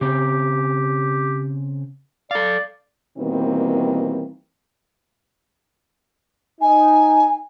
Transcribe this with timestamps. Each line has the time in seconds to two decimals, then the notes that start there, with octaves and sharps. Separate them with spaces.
0.01 C#3 C4 G4
2.31 A4 D5 F5
3.17 B2 D#3 E3 G3 A#3 C4
6.61 D#4 G#5